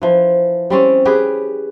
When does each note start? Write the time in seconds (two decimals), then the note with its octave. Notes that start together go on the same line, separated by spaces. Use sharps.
0.02 E3 F3
0.70 G3 C4 C#4
1.05 G4 G#4 B4